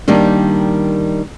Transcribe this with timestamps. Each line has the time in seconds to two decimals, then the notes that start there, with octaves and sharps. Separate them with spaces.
0.08 D#3 G3 A#3 D4